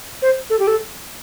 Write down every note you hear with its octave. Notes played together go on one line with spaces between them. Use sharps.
C5
A4
G4
A4